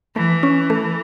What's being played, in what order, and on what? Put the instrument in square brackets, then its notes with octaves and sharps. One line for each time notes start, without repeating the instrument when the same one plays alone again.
[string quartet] E3 [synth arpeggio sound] A3
[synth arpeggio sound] C#4
A3